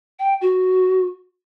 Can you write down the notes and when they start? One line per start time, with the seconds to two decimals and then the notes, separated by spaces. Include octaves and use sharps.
0.19 G5
0.41 F#4